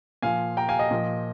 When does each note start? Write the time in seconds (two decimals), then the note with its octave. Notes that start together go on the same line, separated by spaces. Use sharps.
0.22 A#2 F3 F5 G#5
0.57 G5 A#5
0.69 F5 G#5
0.79 D#5 G5
0.91 A#2 F3